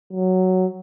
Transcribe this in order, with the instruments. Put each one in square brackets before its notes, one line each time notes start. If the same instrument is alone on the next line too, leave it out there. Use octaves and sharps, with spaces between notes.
[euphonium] F#3